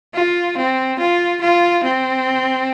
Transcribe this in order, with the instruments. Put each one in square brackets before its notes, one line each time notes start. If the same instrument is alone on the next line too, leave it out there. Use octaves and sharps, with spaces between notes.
[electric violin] F4
C4
F4
F4
C4